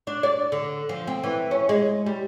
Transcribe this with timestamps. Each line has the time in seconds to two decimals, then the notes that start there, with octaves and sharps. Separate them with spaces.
0.07 D4
0.23 D5
0.52 D3
0.89 F3
1.07 C4
1.24 E3
1.51 C#4
1.69 G#3
2.06 G3